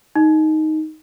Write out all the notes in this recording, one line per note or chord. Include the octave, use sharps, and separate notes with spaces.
D#4